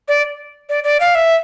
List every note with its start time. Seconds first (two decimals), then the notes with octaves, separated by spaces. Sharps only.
0.08 D5
0.69 D5
0.84 D5
1.00 F5
1.15 E5